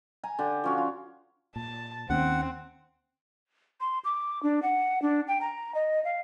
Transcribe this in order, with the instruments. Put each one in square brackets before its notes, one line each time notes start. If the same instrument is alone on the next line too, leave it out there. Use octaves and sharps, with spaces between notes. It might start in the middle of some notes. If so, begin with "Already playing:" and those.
[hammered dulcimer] G#5 A#5
D3 G4
F3 C#4 F#4
F4
[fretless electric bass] A#2 [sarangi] A5
[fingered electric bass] D#2 [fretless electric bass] D#3 A#3 C#4 [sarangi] C4 [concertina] F#5
[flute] C6
D6
D4
F#5
D4
G5
A#5
D#5
F5